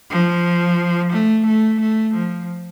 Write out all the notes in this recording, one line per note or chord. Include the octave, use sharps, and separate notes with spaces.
F3
A3
A3
A3
F3